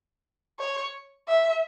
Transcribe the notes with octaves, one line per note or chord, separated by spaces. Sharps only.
C#5
E5